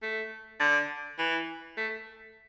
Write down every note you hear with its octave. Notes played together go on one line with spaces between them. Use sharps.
A3
D3
E3
A3